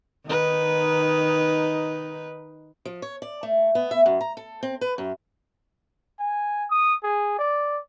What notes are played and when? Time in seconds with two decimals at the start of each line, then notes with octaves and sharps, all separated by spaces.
0.26 D#3 D#4 B4
2.85 F3
3.02 C#5
3.22 D5
3.43 A3
3.75 B3
3.91 E5
4.06 F#2
4.21 A#5
4.37 A4
4.63 C4
4.81 B4
4.98 F#2
6.20 G#5
6.70 D#6
7.03 G#4
7.39 D5